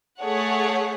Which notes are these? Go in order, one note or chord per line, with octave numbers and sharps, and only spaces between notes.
A3 G#4 C#5 F#5